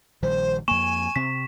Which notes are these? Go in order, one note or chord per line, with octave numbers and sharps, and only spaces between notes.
A#1 D#3 G3 C5
F2 A#3 G#5 C#6 E7
C3 C4 B6